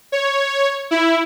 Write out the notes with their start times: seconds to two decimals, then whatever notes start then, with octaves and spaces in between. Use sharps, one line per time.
0.12 C#5
0.91 E4